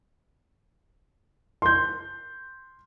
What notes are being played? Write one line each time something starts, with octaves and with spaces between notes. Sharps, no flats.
C6 G6